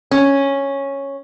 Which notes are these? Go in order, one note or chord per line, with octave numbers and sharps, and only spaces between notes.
C#4